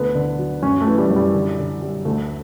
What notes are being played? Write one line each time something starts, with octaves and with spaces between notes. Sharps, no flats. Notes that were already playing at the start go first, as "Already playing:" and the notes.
Already playing: D2 B3
D3
F#3
F#2 C#4
A3
E3
G3
F#2
G3
D3
D3
G3
D2 A3